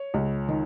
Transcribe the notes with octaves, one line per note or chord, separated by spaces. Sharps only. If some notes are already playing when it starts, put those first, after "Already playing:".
Already playing: C#5
C#2
D#3